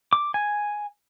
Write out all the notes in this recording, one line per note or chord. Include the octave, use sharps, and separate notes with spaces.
D6
G#5